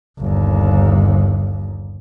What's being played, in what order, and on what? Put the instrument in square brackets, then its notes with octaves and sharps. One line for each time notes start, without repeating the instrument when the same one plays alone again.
[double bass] G1 D#2